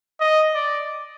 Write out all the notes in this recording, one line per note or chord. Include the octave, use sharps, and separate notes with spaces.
D#5
D5